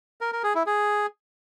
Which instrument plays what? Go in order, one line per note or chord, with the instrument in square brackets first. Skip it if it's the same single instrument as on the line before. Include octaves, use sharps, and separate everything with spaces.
[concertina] A#4
A#4
G#4
E4
G#4